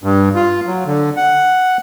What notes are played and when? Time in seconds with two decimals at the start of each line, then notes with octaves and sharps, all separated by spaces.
0.03 G2
0.35 F4
0.67 F#3
0.86 D3
1.17 F#5